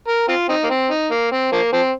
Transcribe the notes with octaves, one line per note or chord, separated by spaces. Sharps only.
A#4
C4 F4
C4 D#4
A#3
C4
D#4
A#3
C4
F3 A#3
F3 C4